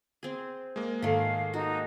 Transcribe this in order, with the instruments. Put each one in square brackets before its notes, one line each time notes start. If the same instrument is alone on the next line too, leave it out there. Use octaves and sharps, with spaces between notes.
[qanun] C4 G#4
[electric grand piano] G#3 A#3
[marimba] G#2 A4 [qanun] D#3 A3 [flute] F5
[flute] D#4 [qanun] F#4